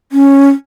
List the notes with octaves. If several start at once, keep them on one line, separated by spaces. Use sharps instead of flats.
C#4